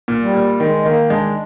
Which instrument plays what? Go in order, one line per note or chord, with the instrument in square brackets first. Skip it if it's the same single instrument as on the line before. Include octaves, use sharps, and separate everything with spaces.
[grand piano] A#2
[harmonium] G3
[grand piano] A#2
[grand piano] D#3 [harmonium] G#3
[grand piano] D#3 [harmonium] A#3
[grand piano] G#3 [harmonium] D4